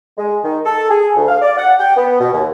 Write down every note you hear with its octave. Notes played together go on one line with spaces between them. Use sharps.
G#3
D#3
A4
G#4
D2
F5
D5
F#5
G5
B3
B2
D#2